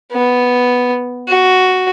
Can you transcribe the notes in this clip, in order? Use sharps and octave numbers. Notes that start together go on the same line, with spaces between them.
B3
F#4